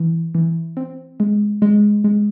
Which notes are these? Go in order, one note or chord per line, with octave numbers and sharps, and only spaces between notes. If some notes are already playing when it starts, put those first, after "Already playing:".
Already playing: E3
E3
C4
G#3
G#3
G#3